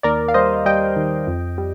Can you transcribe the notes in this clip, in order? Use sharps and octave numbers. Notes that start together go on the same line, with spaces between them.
D#2 A#4 D5
F5
G3 C5 D#5
G3 D#5 G5
D#3
F2
G3